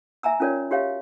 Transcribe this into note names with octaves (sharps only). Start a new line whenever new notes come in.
E5 G#5 A#5 E6
C#4 F4 A#4 C#5 D5
F#4 G4 C#5 E5 F5